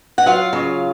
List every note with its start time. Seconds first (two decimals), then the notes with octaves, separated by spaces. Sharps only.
0.18 F#5
0.26 F#3 F4 F5
0.53 C#3